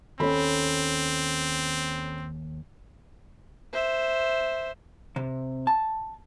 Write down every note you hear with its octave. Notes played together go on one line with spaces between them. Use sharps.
D#2 C4 C#4 A4 B5
C5 E5
C3
A5